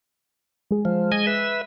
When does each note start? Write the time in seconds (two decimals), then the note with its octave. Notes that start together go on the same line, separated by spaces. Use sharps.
0.71 G#3 G#4
0.85 F3
1.12 D#5 G#5
1.27 B4 E5